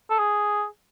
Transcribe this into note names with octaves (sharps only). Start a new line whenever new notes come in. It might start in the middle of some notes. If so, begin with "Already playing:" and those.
A4
G#4